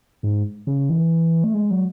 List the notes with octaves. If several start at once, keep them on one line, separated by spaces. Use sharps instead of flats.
G#2
C#3
E3
A3
G#3
F#3